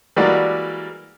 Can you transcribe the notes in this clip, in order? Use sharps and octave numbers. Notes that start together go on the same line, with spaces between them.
E3 G3 G#3 A#3 F#4 D5